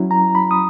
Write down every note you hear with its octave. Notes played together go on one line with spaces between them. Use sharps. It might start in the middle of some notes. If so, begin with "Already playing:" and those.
Already playing: F#3 C#4 E4
A#5
B5
D#6